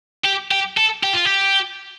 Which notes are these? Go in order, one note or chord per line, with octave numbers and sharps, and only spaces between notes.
G4
G4
A4
G4
F4
G4